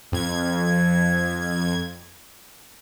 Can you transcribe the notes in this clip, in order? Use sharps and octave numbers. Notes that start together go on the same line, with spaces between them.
F2 G#6